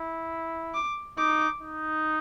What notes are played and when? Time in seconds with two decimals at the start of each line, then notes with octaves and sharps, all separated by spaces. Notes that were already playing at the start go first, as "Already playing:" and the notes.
Already playing: E4
0.74 D6
1.18 D#4 D6
1.61 D#4